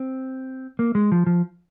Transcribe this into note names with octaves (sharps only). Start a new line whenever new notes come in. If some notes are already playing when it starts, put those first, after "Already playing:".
Already playing: C4
A#3
G#3
F3
F3